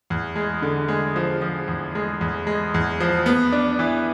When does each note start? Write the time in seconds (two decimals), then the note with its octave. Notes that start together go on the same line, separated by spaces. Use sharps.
0.10 E2
0.36 G#3
0.62 D3
0.88 G#3
1.16 F3
1.42 F3
1.68 E2
1.95 G#3
2.21 E2
2.47 G#3
2.74 E2
3.00 F3
3.26 B3
3.52 D4
3.79 E3